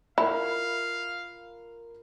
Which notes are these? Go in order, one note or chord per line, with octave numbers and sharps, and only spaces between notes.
E4 F4 A#4 F5 B5